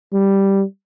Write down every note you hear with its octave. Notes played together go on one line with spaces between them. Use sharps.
G3